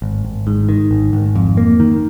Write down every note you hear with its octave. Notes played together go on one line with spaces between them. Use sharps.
G#1
G#1
G#2
D#3
G#1
G#1
F2
A#3
D#3